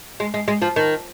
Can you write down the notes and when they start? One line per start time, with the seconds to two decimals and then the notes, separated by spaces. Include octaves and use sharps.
0.20 G#3
0.34 G#3
0.48 G#3
0.62 F3
0.76 D#3